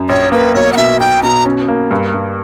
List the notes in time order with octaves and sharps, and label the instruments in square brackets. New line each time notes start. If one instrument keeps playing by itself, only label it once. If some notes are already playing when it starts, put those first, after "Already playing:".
Already playing: [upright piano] F#2
[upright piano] A#1 [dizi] C#5
[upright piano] A#3 [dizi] B4
[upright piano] B1 [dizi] C#5
[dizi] F#5
[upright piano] B2 [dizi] E5
[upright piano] B1 [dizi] G5
[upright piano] B2 [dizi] A#5
[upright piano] C#4
A#3
G2
G2